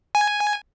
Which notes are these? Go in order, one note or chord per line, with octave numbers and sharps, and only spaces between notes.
G#5